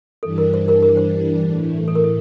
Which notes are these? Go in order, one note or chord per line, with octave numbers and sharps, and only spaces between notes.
G2 E3 G3 D4 A4
A#4
C5
A#4
A#4
C5
A2 E3 A3
A4
A#4
A4